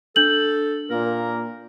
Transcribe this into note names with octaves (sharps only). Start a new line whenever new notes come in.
D4 A4 G6 F#7
A#2 A#3 A#4